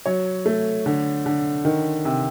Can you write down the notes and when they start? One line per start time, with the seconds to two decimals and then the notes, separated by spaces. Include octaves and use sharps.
0.06 F#3 C#5
0.46 A3
0.86 D3
1.26 D3
1.65 D#3
2.05 C3